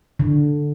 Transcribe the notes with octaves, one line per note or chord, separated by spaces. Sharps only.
D3